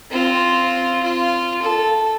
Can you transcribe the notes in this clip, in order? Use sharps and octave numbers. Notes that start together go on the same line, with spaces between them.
C4 F4
F4
A4